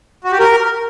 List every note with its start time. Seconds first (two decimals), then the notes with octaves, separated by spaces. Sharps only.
0.24 F#4
0.32 G4
0.39 A#4